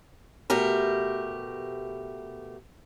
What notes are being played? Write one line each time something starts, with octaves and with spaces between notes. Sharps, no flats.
B2 A3 G4 A#4